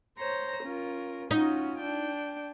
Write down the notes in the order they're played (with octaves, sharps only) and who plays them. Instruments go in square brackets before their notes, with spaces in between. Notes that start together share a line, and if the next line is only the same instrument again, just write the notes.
[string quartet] C5 C#5 A#5
C#4 F4 A#4
[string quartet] C#4 F4 F#4 [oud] D#4
[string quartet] D4 G5